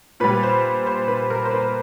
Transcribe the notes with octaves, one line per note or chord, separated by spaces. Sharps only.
A#2 G3 B4
C5
C5
B4
A#4
C5
B4